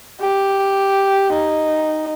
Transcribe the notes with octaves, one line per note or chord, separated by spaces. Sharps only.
G4
D#4